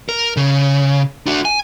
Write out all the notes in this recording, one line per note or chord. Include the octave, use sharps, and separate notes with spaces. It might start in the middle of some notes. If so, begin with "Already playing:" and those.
A#4
C#3
D4 F#4
G#5